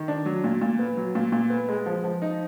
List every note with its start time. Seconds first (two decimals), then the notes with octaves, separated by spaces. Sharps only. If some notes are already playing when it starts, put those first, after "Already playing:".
Already playing: D#3
0.08 D4
0.25 F#3
0.44 A#2
0.61 A#2
0.79 B3
0.97 F#3
1.15 A#2
1.32 A#2
1.50 B3
1.69 G#3
1.86 F3
2.04 F3
2.22 D#4